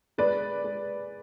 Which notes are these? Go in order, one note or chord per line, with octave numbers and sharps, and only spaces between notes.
G#3 B4 D5
G#3